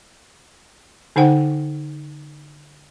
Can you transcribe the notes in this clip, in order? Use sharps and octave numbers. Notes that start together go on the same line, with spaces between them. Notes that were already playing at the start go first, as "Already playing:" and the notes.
D3 D#4 C5 F#5 G5